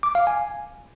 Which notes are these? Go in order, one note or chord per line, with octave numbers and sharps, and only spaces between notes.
D6
F5
G#5